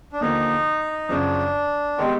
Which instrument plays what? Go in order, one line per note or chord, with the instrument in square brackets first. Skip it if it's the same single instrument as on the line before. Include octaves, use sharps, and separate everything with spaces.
[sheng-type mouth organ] D4
[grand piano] D#2 D3 F3 A#3 [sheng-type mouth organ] D#4
[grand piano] F#2 C#3 F3 [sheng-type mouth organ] D4
[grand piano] D#3 G#3 B3 D#4 G4 [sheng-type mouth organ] C4